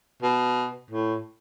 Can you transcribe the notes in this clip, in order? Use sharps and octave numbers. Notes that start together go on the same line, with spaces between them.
B2
A2